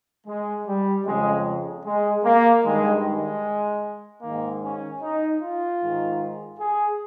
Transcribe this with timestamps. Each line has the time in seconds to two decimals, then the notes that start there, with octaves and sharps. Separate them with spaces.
0.26 G#3
0.66 G3
1.05 F2 C#3 G#3
1.85 G#3
2.24 A#3
2.64 G2 D#3 G#3
3.04 G#3
4.21 G#2 D#3 A#3
4.61 C#4
5.01 D#4
5.41 F4
5.80 G#2 D#3
6.59 G#4